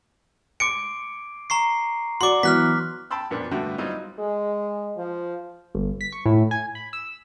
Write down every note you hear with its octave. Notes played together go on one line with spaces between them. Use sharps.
C6 D6 C#7 D7
A#5 C#6 C7
F#4 D5 C6 D6
E3 F#3 B3 F6 F#6 B6
G5 A5 B5 C6 E6
F2 A#2 B3 D4
G2 D3 A3 F#4 B4 G5
F#3 G3 C4 D#4 F4
G#3
F3
G1
B6
C#6
A2
G#5
B5
E6